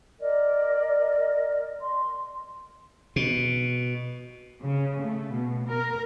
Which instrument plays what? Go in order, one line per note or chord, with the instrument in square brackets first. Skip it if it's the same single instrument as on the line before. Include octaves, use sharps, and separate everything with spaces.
[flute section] A#4 D5 D#5
C6
[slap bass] B2
[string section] C#3
A3
B2
A#4